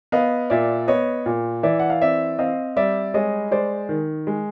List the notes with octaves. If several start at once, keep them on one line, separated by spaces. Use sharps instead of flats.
B3 D#5 F5
A#2 D5 E5
B3 C#5 D#5
A#2
E3 D5 E5
F#5
F5
C4 D5 E5
C4 D#5 F5
G3 D5 E5
G#3 C#5 D#5
G#3 C5 D5
D#3
G#3